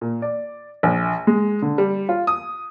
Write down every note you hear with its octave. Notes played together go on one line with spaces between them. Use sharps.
A#2
D5
A#1
G#3
D3
G3
F4
D#6